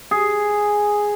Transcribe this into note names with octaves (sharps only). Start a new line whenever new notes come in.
G#4